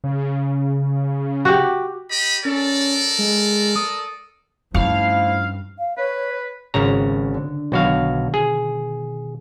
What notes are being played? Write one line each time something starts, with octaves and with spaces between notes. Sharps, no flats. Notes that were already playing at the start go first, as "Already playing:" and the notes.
C#3
F#4 G4
G4 D#5 B5
C#4 A4 A#4 D5
G#3
D#6
G2 F3 A3 C#4 D#4 E4 F5
F5
B4 C#5
G#1 C#3 A#5
D3
B1 B2 D#3 F#4 F5
G#4